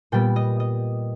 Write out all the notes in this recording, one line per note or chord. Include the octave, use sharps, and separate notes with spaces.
A#2 G3 B3 G5
D#5
D#5